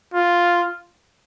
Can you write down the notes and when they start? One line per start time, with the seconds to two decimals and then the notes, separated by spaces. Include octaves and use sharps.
0.14 F4